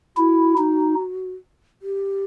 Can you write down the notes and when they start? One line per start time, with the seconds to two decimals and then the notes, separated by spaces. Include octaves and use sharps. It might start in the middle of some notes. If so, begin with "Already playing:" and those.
0.16 E4 F#4
0.58 D#4
1.82 G4